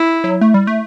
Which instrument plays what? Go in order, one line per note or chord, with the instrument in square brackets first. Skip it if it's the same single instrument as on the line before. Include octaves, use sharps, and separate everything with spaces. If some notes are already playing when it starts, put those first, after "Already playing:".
Already playing: [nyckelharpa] E4
[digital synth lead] F#3
A3
G3
A3